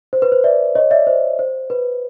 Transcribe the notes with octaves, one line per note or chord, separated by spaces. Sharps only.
C5
B4
C5
D5 E5
C#5 D#5
D5 E5
C5
C5
B4